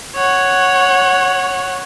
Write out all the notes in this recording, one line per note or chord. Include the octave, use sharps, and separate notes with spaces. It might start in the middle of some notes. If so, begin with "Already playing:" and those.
C#5 F#5